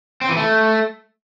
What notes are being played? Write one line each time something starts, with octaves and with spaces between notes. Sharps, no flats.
C4
E3
A3